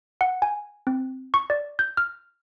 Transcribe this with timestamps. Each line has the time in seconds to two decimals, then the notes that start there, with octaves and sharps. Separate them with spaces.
0.21 F#5
0.42 G#5
0.87 C4
1.34 C#6
1.50 D5
1.79 G6
1.97 F6